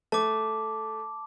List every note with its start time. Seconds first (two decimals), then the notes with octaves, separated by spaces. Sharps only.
0.12 A3 A5 D6